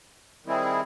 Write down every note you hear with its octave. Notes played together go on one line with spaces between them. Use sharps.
D#3 G3 C4 E4 G#4